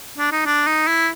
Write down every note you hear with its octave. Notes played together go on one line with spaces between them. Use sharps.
D4
D#4
D4
D#4
E4